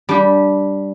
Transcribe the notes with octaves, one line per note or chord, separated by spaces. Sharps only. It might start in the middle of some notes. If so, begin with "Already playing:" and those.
G3 D4 G4